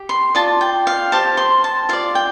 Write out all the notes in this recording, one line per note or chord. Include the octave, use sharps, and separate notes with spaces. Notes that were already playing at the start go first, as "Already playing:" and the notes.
Already playing: G4
C6
F4 D5 A5
G5
F5
G4 C5 A5
C6
A5
F4 D5 F5
G5